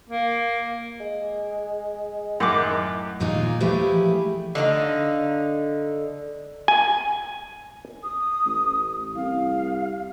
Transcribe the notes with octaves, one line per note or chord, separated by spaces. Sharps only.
A#3
G#3
F#2 A2 D#3 F#5 C6 D6
D#2 A#2 A#3 D#4 F4 G#4
E3 F3 A3 E4 G4 G#4
D3 D#4 F4 F5
G#5
D#6
A1
C2 F5